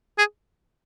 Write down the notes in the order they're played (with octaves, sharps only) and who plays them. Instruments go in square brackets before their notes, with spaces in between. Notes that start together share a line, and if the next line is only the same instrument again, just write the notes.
[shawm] G#4